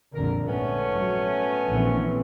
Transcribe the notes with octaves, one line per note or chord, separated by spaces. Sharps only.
A#1 F2 D3 A#4
G#2 A3 B3 C#4
F#3
A#1 E3 C4